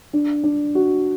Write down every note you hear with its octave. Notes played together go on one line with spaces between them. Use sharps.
D4
D4
F#4